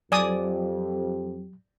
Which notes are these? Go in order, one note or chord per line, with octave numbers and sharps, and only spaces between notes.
F2 F#3 G4 D5 G#5 D#6